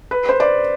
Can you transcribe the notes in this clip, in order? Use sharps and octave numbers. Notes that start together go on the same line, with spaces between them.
B4
C5
D5